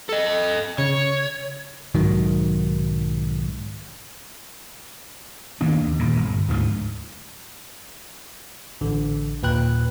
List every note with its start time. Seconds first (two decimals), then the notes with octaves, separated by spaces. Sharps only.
0.09 A4 D#5
0.78 C#3 C#5
1.94 B1 G#2 D#3 F#3
5.61 D#3 A#3 B3 D4
5.84 D#2
5.99 D#1 A#2
6.18 G1
6.48 D2 G#2 D3 F3
8.81 A1 D3
9.43 D#2 A#2 B4 G5 F#6